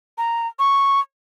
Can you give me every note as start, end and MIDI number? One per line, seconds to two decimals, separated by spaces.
0.18 0.47 82
0.59 1.00 85